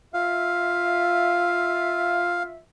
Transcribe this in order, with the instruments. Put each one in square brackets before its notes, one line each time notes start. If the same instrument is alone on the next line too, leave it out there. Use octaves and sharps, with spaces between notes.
[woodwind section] F4 E5 [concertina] F5